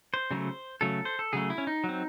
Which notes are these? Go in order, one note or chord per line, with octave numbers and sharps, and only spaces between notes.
C5
C#3 F#3 A3
C#3 F#3 A3 A4
C5
A4
C#3 F#3 A3 G#4
E4
C#4
D#4
F#3
C4